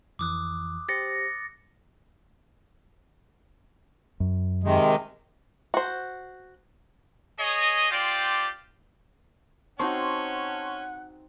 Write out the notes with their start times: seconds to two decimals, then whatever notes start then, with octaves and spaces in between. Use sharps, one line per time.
0.19 F2 E3 D6 D#6 F#6
0.89 G4 C5 A6 A#6 C#7
4.20 F#2
4.63 C3 D#3 G#3
5.74 F#4 C5
7.38 G#4 C#5 D#5
7.91 C4 F4 G4 D5
9.79 C4 C#4 D#4 F#4 F#5 A5 C6 C#6